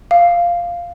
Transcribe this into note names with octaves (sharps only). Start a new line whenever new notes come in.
F5